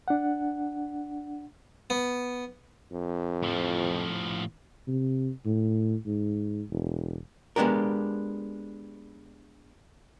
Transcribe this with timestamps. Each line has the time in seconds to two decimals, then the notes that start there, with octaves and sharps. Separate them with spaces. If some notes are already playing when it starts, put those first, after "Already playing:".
0.08 D4 F#5
1.90 B3
2.92 F2
3.43 A2 F3
4.88 C3
5.45 A2
6.06 G#2
6.71 E1
7.56 G#3 B3 D4 G4 A#4